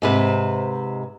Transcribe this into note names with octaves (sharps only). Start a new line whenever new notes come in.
G#2 C3 B4